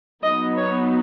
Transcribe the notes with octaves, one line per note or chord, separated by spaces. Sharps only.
F#3 B3 D#4 D#5
C#5